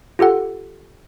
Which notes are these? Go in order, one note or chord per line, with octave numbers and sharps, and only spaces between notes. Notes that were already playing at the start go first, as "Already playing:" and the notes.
F4 G4 A4 F#5